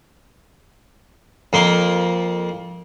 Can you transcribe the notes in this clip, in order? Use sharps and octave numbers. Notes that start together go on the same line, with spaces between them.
F2 A#3 C6